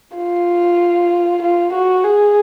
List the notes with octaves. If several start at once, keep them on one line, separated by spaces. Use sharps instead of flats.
F4
F4
F#4
G#4